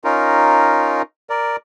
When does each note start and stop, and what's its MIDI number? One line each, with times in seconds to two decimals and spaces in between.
0.04 1.02 61
0.04 1.02 63
0.04 1.02 65
0.04 1.02 70
1.30 1.56 70
1.30 1.56 74